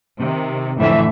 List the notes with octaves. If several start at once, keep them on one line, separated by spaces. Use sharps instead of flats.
C3 D#3
F2 A2 D3 E3 A3 E5